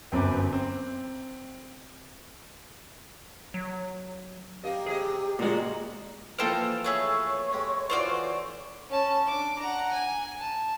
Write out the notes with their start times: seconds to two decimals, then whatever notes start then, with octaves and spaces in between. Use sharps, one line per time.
0.12 G1 F#2 C4 B4 D6
0.52 C4
3.54 F#3
4.64 A#3 D#4 G4 D#5
4.86 C3 G#3 G#4 D#5
5.39 A#2 G#3 D#4 F#4 A#4
6.39 E3 F3 A#3 A4 C5 D#5 G5 F6
6.84 A3 G#4 B4 C#5 C#6
7.53 G#3 G4
7.90 E3 F4 F#4 C5 D5
8.90 C#4 A5
9.27 D4 D6
9.59 F#5 A#5
9.93 G#5
10.39 A5